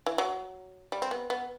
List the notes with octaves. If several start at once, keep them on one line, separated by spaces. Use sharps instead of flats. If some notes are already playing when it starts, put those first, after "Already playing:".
E3
F#3
G3
C4
B3
B3